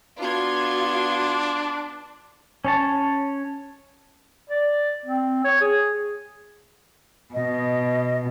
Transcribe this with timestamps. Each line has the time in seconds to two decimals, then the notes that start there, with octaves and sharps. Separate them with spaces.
0.20 B3 D4 F4 F#4 C6 G#6
2.65 C#4 C#5 A5
4.49 D5
5.06 C4
5.44 C#5
5.61 G#4
7.34 B2 D#5